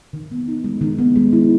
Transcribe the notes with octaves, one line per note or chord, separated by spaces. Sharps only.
D#3
B3
D#4
G#3
D#3
B3
G#3
E4